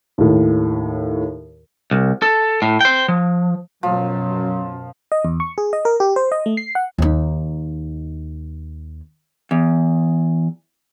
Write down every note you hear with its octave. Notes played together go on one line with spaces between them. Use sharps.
D#2 A2
C2
A4
A2
C5 G5
F3
F#2 B2 F3 F#3
D#5
E2
C#6
G#4
D#5
A#4
G4
C5
D#5
A3
C7
F#5
D#2 D#4
E2